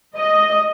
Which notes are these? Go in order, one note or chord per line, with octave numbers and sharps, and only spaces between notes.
D#5